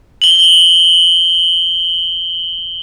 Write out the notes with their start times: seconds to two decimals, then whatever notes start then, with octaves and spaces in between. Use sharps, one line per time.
0.22 F#7 G7